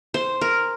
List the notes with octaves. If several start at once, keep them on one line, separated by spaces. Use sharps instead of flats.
C5
A#4